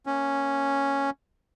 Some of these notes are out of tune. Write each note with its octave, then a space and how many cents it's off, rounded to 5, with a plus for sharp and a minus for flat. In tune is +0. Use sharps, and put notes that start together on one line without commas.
A#3 +0 C#4 +0